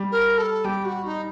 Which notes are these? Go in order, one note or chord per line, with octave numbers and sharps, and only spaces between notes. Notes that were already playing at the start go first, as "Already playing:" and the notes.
Already playing: G3
A#4
A4
G3 G4
F#4
D#4